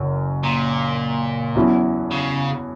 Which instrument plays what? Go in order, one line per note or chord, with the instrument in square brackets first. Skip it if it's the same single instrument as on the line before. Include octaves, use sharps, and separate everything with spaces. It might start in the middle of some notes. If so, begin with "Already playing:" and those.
Already playing: [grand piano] F#1 F#2
[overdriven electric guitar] A#2
[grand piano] E2 B2 F#3 C#4 E4
[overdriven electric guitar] C#3